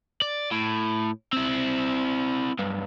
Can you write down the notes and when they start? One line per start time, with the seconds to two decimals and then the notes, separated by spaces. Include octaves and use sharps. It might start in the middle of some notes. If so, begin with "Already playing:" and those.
0.22 D5
0.51 A2
1.33 C4 E4
2.59 B1 G2